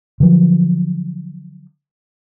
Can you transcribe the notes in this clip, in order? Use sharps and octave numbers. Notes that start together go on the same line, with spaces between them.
D3 F3 F#3